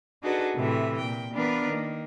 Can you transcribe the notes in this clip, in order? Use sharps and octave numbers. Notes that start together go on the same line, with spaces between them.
D4 D#4 F#4 G#4 A4 B4
A2 C3 E3 E5
A#2 G5
E3 B3 D4 F4 A#4 B4
D#3 A#3